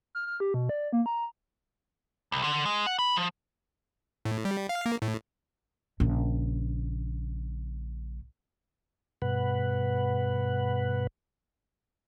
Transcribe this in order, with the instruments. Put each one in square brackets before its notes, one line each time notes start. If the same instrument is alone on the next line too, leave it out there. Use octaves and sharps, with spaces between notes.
[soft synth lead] F6
F6
G4
B2
D5
A#3
A#5
[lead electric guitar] C2
D3
G#3
F#5
B5
F3
[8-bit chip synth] A2
G3
F5
A#3
A2
[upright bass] A#1 C#3
[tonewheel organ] G2 B2 B4 F#5